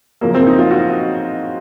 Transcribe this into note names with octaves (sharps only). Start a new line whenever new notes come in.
F#2 C#3 F3 A#3
C4
D#4
F4
F#4